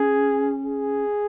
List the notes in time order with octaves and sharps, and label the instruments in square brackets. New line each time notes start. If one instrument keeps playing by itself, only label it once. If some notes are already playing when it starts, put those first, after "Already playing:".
Already playing: [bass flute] C#4 [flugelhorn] G#4
[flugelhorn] G#4